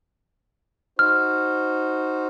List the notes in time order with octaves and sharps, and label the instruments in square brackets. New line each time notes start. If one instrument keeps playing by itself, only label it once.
[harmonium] D#4 F#4 C5 [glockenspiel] F6